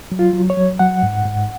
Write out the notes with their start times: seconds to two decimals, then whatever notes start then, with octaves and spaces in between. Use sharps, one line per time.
0.12 F#3
0.19 F4
0.33 F#3
0.50 C#5
0.57 F#3
0.79 F#3 F#5
1.03 G#2
1.25 G#2